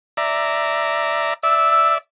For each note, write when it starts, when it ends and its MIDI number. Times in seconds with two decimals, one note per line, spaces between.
0.17 1.34 74
0.17 1.34 76
0.17 1.34 82
1.43 1.98 74
1.43 1.98 76
1.43 1.93 88